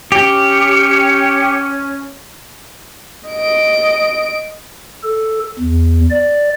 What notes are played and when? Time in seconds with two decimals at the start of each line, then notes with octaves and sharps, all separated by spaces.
0.12 C#4 G4 C#7
3.29 D#5 D7
5.04 A4
5.59 E2
6.11 D5